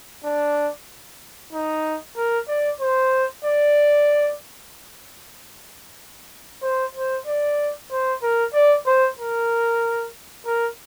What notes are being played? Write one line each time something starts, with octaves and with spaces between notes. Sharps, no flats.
D4
D#4
A#4
D5
C5
D5
C5
C5
D5
C5
A#4
D5
C5
A#4
A#4